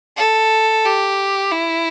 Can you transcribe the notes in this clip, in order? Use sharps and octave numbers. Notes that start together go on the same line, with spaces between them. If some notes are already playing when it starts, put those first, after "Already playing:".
A4
G4
E4